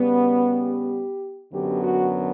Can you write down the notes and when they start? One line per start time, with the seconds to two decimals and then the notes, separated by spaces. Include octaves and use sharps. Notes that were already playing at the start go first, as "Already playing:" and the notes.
Already playing: C#3 G3 B3
0.39 G4
1.53 F#2 D3 F#3 B3 G4
1.82 F#4